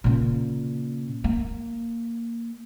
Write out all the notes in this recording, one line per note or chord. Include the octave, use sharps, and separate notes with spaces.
A#2 C#3
A#3